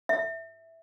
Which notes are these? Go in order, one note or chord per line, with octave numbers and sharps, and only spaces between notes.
E5